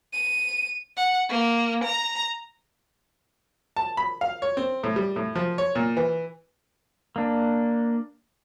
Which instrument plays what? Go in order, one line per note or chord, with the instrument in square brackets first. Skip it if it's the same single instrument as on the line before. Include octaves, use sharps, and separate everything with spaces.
[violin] D#7
F#5
A#3
A#5
[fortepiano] A5
B5
F5
C#5
C4
A2
G3
A2
F3
C#5
A#2
E3
[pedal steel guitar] A#3 D4